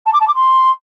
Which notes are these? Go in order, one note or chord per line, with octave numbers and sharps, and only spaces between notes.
A5
D6
A5
D6
C6